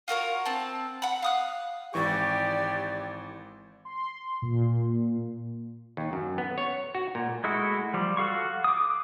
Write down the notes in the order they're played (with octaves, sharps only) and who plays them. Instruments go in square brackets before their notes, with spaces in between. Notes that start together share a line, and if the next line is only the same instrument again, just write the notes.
[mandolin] F4 F#4 A#4 C#5
C4 A5
F#5 B5
F5 D#6 F#6
[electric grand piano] G#1 E3 C#6 [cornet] G4 [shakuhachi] D5
[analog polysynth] C6
A#2
[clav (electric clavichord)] D#2
F#2
B3
C#5
F#4
A#2
[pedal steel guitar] G#3 A3 E4 F#4
F3 G3
F#4 A4 F5 C#6
D6 D#6